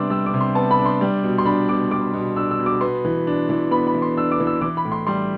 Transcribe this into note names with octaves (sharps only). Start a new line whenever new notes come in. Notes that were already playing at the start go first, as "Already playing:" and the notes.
Already playing: C3 G3 B3 D4 C6 D6 E6
G3 E6
D6
C3
C6
B3 A5
B5
D4
C6
G3
B2
C6
D4 B5
B2 D6
G3 D6
B2
D4 E6
E6
B2
D6
B3 C6
E3
D4
E3
B3 B5
B5
E3
C6
D4 E6
D6
E3
E6
E3 D6
B5
A2
C6
G3 C6